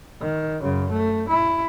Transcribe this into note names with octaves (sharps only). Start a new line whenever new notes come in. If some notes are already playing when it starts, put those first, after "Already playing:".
D#3
F#2 C#3
A3
E4